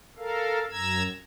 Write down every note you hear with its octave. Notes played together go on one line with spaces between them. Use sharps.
A4 A#4 F5
F#2 A#5 E6 G#6